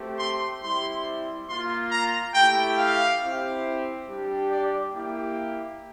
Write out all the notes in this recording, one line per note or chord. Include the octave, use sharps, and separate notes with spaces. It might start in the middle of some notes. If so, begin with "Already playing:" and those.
Already playing: A3 C4 G4
C6
G3 C4 E4 G4 C6
A#3 F4 C6
A#5
A3 E4 G4 G5
F5
C4 E4 G4
G3 D4 G4
D5
A#3 E4 G4